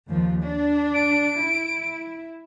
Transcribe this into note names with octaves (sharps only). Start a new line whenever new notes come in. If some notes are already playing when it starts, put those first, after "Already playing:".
D#2 F3
D4
D7
E4